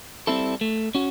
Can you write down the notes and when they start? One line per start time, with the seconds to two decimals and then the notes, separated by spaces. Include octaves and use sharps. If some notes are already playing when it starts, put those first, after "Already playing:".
0.27 G3 C4 E4 A4
0.61 A3
0.95 C#4 F#4